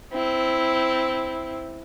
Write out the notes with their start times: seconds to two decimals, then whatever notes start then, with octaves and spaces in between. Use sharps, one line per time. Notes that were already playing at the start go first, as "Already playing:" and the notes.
0.12 C4 E4